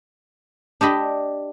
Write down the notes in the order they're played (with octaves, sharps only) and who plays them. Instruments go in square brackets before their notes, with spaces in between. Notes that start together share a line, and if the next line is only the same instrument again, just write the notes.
[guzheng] D4 G4 D#5 B5